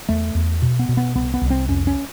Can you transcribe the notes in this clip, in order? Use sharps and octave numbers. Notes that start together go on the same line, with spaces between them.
E2 A3
E2
B2
B3
B2
B3
C2 B3
B3
C2
C4
F2 C#4
C#4